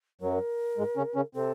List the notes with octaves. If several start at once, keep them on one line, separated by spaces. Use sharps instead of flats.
F#2 F#3 A#4
G#2 G#3
C#3 C#4
C#3 C#4
C3 C4 A4